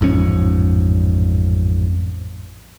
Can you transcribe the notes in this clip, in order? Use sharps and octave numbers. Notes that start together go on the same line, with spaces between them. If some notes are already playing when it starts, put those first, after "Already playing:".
A1 F2 G#2 C#4